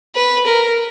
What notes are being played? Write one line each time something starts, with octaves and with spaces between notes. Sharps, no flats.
B4
A#4